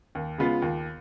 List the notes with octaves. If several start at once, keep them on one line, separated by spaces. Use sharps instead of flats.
D#2
C#3 G#3 B3 F4
D#2